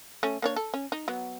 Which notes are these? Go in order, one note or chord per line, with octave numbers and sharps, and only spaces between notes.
A3 C#4
A#3 D4 C#5
A4
C#4
D#4
F#3 B3